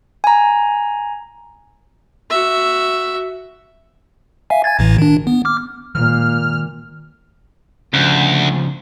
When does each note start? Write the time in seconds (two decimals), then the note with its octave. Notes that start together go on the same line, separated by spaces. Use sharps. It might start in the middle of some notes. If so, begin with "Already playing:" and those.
0.24 G#5 A#5
2.30 F#4 E5
4.50 E5 F5 G#5
4.64 G#5 G#6 A6
4.79 A1 A2 E3
4.98 D#3 D4
5.27 B3
5.45 D6 F6
5.95 A#2 D#3 G3 G#3 F6
7.94 D2 C#3 F3